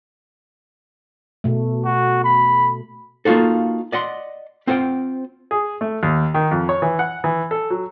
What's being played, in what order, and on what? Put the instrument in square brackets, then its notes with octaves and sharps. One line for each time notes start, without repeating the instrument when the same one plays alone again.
[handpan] B2 A3
[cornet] F#4
B5
[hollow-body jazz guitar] A#3 D#4 F4 F#4 A4
D5 D#5 F#5 C6
C4 F4 C5 F#5 G5
[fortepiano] G#4
A3
D#2
D#3
F2
C#5
E3
F#5
E3
A4
F#3